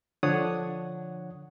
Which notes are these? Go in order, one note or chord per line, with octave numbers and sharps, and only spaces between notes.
D3 F3 D4 C#5 F#5 D#6